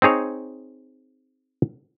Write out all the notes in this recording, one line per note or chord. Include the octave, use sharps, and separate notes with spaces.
C4 D#4 G#4 C#5